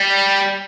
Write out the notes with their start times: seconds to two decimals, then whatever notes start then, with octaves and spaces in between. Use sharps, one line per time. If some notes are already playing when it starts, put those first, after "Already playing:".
Already playing: G3